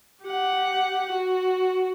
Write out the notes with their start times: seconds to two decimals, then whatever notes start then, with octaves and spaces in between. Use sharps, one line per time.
0.24 G4 F#5
1.13 F#4